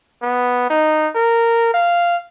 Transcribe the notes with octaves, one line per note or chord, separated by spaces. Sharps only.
B3
D#4
A#4
F5